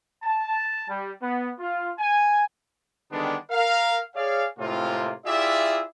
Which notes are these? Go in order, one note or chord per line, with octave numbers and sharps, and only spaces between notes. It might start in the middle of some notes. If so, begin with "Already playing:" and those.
A5
G3
B3
F4
G#5
D3 D#3 G3 G#3 B3 D4
A#4 F5
G#4 C#5 D5 F5
A2 C3 G#3 A#3 C4 F4
E4 F4 G4 G#4 D5 E5